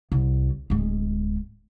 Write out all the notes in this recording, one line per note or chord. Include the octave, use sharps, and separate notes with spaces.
C2
D1 G#3